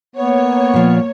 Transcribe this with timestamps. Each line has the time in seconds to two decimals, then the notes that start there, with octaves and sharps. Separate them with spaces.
0.16 A#3 B3 C#5
0.74 A#2 F3